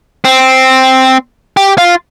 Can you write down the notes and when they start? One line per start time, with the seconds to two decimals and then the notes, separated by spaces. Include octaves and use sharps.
0.25 C4
1.57 G4
1.78 F4